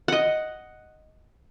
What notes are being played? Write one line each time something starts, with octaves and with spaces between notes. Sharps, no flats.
D#5 F#5